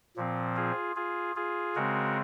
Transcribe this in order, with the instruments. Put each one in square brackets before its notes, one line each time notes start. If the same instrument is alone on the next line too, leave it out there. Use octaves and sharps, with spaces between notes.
[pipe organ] A#2 F3 C4
F4 G#4
F4 G#4
F4 G#4
C#3 G#3 C4 F#4 A#4